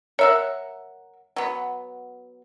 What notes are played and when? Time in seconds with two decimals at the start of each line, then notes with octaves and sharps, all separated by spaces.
0.19 A#4 C#5 E5 F#5
1.36 F#3 B3